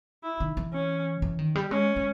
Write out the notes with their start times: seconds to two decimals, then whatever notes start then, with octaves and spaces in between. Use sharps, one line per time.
0.23 E4
0.40 D#3
0.57 E3
0.73 C#4
1.22 E3
1.39 D#3
1.56 G3
1.71 G#3 C#4
1.96 G#3